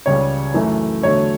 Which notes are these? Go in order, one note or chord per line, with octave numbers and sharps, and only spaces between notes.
C#2 C#3 G3 C#5
F#2 E3 A3
E2 D3 F#3 A3 C#5